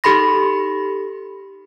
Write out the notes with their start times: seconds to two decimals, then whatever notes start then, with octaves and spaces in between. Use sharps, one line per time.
0.04 D#4 G4 A4 B5 C6 A#6